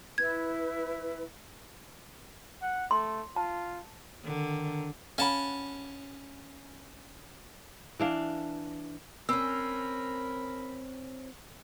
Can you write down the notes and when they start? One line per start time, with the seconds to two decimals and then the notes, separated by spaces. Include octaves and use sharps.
0.18 E4 B4 G#6
2.62 F#5
2.91 A3 C6
3.36 F4 A5
4.24 D3 D#3
5.18 C#4 F5 F#5 A5 B5
7.99 E3 D4 F5
9.29 C4 C#4 A#4 B5 E6